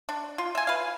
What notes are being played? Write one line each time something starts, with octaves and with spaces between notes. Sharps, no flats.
D4
F4
E5 G#5
B4 F5